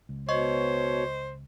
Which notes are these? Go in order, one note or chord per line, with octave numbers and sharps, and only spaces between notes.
C#2
B2 C5 C#5 D#5 C#6